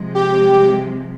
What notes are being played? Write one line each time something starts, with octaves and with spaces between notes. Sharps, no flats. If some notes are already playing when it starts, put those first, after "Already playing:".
Already playing: C3 F3 G#3
G4